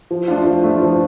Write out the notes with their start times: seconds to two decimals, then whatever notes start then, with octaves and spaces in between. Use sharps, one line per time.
0.11 F3
0.28 A3 D4 F4
0.46 F3
0.64 A3 D4 F4
0.82 F3